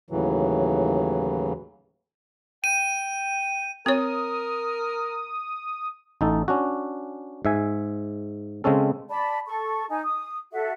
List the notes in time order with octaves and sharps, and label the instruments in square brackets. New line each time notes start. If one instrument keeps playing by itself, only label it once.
[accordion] D#2 A2 C#3 E3 F#3
[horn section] G5 [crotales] D#7
[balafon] C4 C#5 [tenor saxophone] A#4 [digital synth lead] D#6
[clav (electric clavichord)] A1 D#4 A4
C#4 D4 F#4
G#2 E5 G#5
C#3 G#3 C4 C#4 A4
[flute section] D5 A5 B5
A4 C#6
D#4 G#5
D#6
F#4 A4 E5